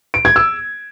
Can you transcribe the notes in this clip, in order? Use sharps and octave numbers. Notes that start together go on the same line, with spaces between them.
D7
G#6
E6